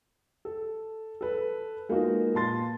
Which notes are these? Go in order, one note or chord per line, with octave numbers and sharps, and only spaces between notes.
A4
A4 B4
G#3 A#3 B3 D#4 F4 F#4
A#2 A5 C6 A6